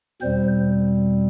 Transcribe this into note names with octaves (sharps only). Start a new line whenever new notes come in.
E2 B2 G3 C4 C5